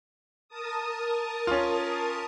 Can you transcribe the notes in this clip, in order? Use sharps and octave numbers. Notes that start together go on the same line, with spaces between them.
A#4 A5 D#6
C#4 F4